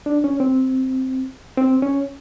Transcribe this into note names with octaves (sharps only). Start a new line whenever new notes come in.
D4
C#4
C4
C4
C#4